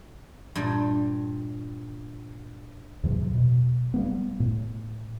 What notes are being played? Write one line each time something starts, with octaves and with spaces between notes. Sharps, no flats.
G2 A#2 G3
E2 A2 C3 F#3
B2
G3 A#3 B3
A2